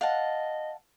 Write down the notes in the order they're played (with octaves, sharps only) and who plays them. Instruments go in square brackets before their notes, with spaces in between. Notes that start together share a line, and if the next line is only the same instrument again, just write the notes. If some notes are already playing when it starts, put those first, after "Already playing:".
[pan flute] D#5 [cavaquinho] F5 F#5 A5